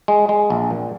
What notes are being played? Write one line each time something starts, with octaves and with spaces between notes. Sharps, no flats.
G#3
G#3
A#1
A#2